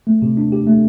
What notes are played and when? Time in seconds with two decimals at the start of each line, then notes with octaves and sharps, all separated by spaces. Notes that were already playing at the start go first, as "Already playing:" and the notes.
0.07 A3
0.22 C3
0.37 D4
0.52 G4
0.67 A3